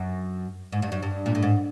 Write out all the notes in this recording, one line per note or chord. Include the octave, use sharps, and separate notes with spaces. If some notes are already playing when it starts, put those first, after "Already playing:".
Already playing: F#2
G#2
G2
F#2
G2
A#2
A2
G#2